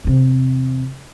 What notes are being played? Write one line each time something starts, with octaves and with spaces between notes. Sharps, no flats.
E2 C3